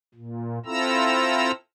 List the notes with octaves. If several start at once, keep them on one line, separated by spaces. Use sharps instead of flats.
A#2
C4 E4 F4 A4 A#5 E6